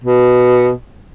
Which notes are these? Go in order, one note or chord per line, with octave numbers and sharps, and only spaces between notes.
B2